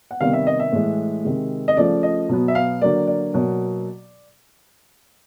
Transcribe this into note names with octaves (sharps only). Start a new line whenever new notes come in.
F#5
C3 D#3 G3 B3 F5
E5
D#5
E5
A2 E3 G#3
C3 D#3 G#3
D#5
C#3 F3 A3 D5
D#5
B2 F#3 B3
E5
F5
D3 F#3 A#3 D5
D5
B2 F#3 A#3